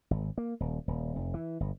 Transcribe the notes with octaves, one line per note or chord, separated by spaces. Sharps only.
G#1
A#3
D#1
D#1
F1
E3
G1